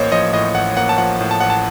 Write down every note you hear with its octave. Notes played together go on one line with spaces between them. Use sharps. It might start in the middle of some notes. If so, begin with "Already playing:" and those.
Already playing: A1 A#3 C5 C#5 D#5
F3 D#5
A2 D#5
A1 F#5
A#3 F#5
A5
F3 F#5
A2
A5
A1 F#5
A5